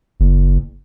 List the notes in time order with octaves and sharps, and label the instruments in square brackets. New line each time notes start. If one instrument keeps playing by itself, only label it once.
[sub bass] F#1